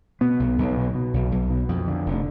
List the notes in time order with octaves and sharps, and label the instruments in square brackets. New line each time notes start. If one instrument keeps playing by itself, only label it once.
[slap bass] B2 B3
B1
B1
B2
B2
B1
B1
B2
F2
D3
F1